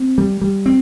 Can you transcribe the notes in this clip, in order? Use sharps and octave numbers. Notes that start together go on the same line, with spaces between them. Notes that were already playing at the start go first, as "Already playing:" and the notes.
Already playing: C4
G3
G3
C4